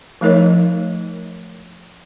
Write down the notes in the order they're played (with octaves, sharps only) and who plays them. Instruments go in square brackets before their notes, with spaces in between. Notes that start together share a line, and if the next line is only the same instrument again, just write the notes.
[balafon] F3 A3 D#4 A#4 C#5 D#5